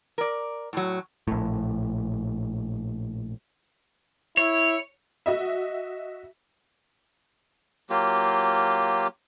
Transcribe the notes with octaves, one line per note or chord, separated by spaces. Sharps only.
A#4 D5
A2 F#3
A#1 A2
E4 C#5
F#4 D#5 E5
F#3 A#3 F4 G4